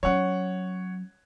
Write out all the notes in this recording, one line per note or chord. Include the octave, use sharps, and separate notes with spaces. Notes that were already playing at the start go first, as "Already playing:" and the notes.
F#3 C#4 C#5 F#5